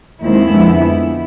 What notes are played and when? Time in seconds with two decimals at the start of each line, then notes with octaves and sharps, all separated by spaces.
0.21 D#2 D#3 G#3 C4 E4
0.51 F2 D3 F3 G#3 B3